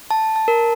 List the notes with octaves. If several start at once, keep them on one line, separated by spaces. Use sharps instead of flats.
A5
A5
A#4